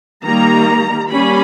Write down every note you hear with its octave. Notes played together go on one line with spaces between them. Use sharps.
D#3 G3 A#3 A#5
G3 A#3 C#4 B5